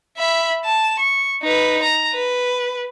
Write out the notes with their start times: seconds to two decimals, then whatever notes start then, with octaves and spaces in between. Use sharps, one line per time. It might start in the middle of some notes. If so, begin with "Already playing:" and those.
0.17 E5 B5
0.64 A5 E7
0.99 C#6
1.42 D#4 B4
1.83 A#5
2.13 B4